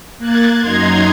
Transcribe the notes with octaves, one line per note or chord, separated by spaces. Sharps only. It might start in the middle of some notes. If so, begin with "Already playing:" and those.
A#3 F#6 G#6 A6
F#2 D#4 A#5 C6 G#6